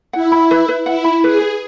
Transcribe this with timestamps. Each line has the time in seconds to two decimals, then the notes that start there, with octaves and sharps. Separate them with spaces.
0.13 E4 F#5
0.32 B5
0.51 B4
0.69 B4
0.86 E4 F#5
1.04 B5
1.24 G#4 B4
1.41 B4